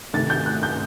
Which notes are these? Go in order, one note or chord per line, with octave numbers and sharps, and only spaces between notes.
C3 D#3 A3 A6
G6
F#6
G6